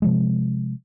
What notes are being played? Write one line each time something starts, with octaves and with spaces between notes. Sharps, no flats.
C3 F3 G#3